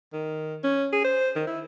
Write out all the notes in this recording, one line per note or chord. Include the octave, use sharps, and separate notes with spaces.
D#3
C#4
G#4
C5
D#3
E4